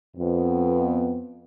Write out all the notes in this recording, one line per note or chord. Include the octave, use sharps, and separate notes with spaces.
F2 B3